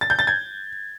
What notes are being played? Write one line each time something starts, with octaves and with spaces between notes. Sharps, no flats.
A6
G6
A6
G#6